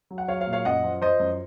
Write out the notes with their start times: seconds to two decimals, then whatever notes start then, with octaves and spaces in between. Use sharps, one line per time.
0.11 F#3
0.18 F#5
0.28 F#3 C#5 F5
0.41 C#5 F5
0.47 A#2
0.53 C#5 F5
0.65 F#2 D#5 F#5
0.84 F3
1.02 F3 C5 D#5
1.20 F#2